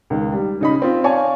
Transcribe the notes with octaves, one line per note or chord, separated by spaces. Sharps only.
C#2 D#3
G3
C#3 D#4 B5
C4 F4
C#5 D5 F5 G#5 A5 C#6